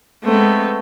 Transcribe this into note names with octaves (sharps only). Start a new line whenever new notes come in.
G#3 A3 B3 C4